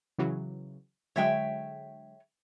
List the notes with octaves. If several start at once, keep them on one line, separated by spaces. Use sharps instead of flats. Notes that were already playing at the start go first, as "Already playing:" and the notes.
C#3 E3 F#3
D3 F#3 G#3 C#5 E5 G5